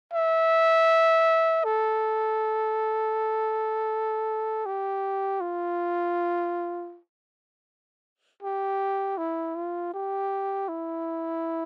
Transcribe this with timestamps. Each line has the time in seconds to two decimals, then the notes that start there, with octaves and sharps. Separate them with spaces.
0.13 E5
1.64 A4
4.66 G4
5.41 F4
8.43 G4
9.18 E4
9.56 F4
9.94 G4
10.68 E4